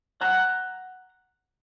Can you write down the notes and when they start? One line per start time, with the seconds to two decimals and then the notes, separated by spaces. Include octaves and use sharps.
0.21 F#5 A#5